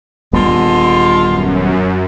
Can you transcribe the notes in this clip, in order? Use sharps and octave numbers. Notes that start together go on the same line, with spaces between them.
D#1 D3 G3 G#3 B3 F4
F#2